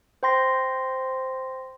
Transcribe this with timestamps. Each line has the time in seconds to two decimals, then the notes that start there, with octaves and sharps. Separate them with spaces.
0.23 C5 G5 C6 A#6